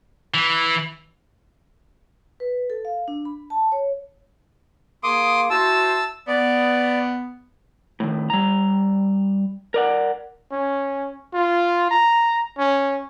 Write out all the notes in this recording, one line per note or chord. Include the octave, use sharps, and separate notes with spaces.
E3
B4
A4
F5
D4
B5
A5
C#5
A#3 G#4 C6 D6 D#6
E4 F#4 C5 A5 E6
B3 D5
A2 D3 D#3
G3 A#5
A#4 D5 F#5
C#4
F4
A#5
C#4